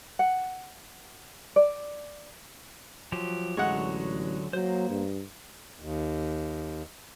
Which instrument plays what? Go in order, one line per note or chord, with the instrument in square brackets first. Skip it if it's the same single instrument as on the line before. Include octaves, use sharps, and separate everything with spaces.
[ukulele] F#5
D5
[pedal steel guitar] F3 F#3 G4
[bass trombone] A1 [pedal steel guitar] D3 F#3 C#6 [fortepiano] G#3 F#5
[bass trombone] F#3 [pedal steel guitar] A#3 C5
[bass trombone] G2
[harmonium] D#2